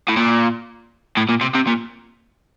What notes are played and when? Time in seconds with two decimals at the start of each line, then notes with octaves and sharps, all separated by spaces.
0.09 A2
0.17 A#2
1.17 A2
1.29 A#2
1.41 C3
1.55 C3
1.67 A#2